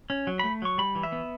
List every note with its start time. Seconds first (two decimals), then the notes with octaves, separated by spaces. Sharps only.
0.10 C#4
0.27 F#3
0.39 A3 B5
0.62 F#3 C#6
0.78 G3 B5
0.95 E3
1.03 E5
1.12 B3